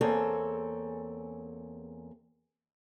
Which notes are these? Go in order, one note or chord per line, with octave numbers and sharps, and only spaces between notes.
E2 A#3 C4 G#4 A4 C#5